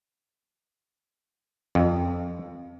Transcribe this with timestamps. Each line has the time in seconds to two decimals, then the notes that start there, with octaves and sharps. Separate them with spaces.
1.75 F2